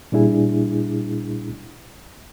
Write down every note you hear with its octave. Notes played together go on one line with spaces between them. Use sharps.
A#2 G3 D4 E4 G#4